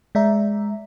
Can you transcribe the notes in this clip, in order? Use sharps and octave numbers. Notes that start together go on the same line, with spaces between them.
G#3 D5 E5 A#5